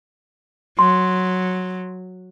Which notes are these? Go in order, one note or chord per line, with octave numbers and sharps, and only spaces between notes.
F#3 C6